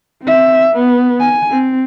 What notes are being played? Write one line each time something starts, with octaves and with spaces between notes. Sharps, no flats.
C4 E5
B3
G#5
C4